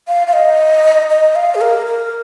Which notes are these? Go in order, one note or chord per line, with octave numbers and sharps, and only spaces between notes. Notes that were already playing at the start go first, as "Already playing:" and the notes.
F5
F5
D#5
D#5
F5
G#4
A#4
A#4